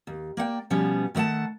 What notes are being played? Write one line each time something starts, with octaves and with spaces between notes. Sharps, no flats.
D#2
A#3 D5 F#5 G5
B2 F3 G3 B3 C#4
D#3 A3 D5 F#5 A5